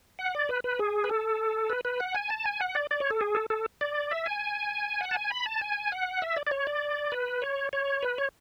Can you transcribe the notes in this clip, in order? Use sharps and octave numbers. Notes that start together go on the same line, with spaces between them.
F#5
D5
B4
B4
G#4
B4
A4
B4
B4
F#5
G#5
A5
G#5
F#5
D5
D5
C#5
A4
G#4
A4
A4
D5
E5
G#5
F#5
A5
G#5
B5
A5
G#5
F#5
E5
D5
D5
C#5
D5
B4
C#5
C#5
B4
C#5